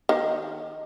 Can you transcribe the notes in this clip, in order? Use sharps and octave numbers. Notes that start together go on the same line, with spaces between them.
D#3